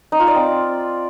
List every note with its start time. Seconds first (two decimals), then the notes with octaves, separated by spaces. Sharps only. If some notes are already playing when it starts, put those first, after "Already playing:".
0.12 D#4
0.20 F4
0.28 D5
0.35 C4